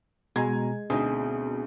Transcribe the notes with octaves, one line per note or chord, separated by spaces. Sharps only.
B2 G#3 G#5 A#5 G#6
D2 B2 C4 D#4 G#4